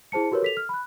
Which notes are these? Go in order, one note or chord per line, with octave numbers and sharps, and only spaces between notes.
E4 G#4 C5 A5 C#7
F#4 G4 A#4 B4 C#5
A4 B6 F7
F6
B5 F#6